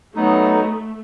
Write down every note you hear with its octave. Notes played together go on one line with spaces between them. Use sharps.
F#3 A3 B3 D#4